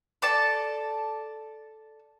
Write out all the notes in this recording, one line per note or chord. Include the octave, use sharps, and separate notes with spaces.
A4 D5 A5